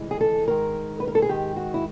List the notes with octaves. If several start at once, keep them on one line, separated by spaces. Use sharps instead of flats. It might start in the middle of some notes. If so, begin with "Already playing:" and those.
Already playing: D2 C3 E3 G#3
G#4
A4
G#2 D#3 G#3 A#4
B4
A#4
A4
G#4
G#2 D#3 G#3 G4
F#4
E4